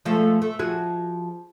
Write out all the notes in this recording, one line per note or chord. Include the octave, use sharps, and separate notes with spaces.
F3 G#3 A3
A3
F3 F#4 G#4